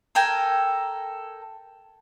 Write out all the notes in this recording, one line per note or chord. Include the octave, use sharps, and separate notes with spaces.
A4 A#4 G5 G#5